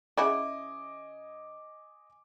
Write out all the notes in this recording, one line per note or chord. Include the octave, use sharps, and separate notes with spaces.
C#3 E4 D#5 F#5 G#5 D6